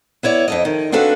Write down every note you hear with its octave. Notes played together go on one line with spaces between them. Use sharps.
B3 E4 C#5 D5
F2 A4 D#5
D#3
C4 D4 F#4 A4 B4 F5